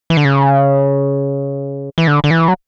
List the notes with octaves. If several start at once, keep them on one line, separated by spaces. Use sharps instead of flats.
E3
D3
C#3
E3
D3
D3
E3
F#3